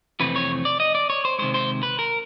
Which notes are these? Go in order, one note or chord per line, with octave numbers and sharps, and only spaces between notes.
F2 C3 E3 A3 C4 B4
C#5
D5
D#5
D5
C#5
C5
C3 D#3 G#3 C5
C5
B4
A#4